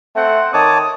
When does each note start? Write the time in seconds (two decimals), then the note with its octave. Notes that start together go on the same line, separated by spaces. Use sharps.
0.16 A3 C4 C5 F#5
0.54 D#3 C#5 A5 D6 D#6